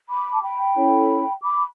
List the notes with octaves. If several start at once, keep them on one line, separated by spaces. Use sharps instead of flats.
B5 D6
A5
G5 B5
C#4 E4 A4 C#5
B5 D6